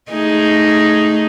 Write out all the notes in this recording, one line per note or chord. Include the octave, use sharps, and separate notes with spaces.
A3 D#4 G#4